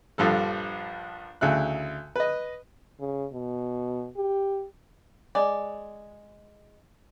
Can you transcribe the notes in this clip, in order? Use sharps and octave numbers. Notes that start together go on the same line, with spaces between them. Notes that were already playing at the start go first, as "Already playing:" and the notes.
A#1 G2 F3 A4
D2 C#3 E4 F#6
B4 D#5
C#3
B2
G4
G#3 D5